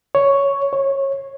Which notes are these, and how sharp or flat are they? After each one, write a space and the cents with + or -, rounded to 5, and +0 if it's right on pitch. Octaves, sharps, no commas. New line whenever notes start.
C#5 +5
C#5 -20